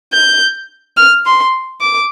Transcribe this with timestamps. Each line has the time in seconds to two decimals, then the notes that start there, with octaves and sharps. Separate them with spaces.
0.13 G6
0.97 F6
1.26 C6
1.81 D6